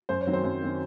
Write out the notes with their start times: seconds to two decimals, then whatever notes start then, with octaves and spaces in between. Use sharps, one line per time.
0.09 F#2 C5
0.21 C#5
0.27 D#3 F#3 C4
0.33 C5
0.44 F#2
0.61 D#3 F#3 C4